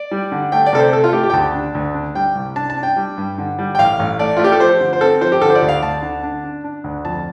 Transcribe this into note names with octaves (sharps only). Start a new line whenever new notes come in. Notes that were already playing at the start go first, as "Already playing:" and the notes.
Already playing: D5
G3
D3
A3 G5
D5
C3 A4
C5
A3 A4
F4
A3 G4
G4
G5
D2 A5
D4
D2
D4
G3 G5
C2
D4 A5
A5
D4
G5
G3
G2
D3
G3
G5
A1 F5
A1
A3 D5
A3 F4
G4
A4
F3 C5
D3
C5
C4 A4
F3 C5
G4
D3 A4
C5
D5
D2
F5
D2 A5
D3
D4
D4
D4
D2
F2 A5